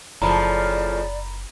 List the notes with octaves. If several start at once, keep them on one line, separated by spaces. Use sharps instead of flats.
F#1 A2 C#3 F3 D5 A#5 B5